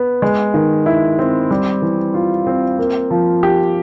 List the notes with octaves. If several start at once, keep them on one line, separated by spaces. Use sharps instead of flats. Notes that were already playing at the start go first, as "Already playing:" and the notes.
Already playing: B3
G#3
D#3
E4
C4
G3
E3
F4
C4
A#3
F3
G4